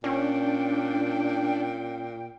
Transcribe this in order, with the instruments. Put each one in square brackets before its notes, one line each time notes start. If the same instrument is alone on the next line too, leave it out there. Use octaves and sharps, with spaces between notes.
[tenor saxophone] A#2 [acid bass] C#4 [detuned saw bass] D4 [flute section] G5